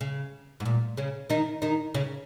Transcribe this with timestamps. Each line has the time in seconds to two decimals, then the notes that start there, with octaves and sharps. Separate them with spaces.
0.01 C#3
0.60 G#2
0.66 A#2
0.97 C#3 C#4
1.30 D#3 D#4
1.62 D#3 D#4
1.94 C#3 C#4